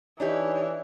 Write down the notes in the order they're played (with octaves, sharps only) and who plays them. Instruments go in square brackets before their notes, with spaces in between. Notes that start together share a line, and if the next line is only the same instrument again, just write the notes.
[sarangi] E3 [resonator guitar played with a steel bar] D4 D#4 G4 [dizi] C#5